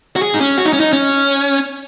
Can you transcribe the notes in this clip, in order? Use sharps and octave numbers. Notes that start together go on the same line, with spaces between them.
F#4
G#4
D#4
C#4
F#4
D#4
C#4
D#4
C#4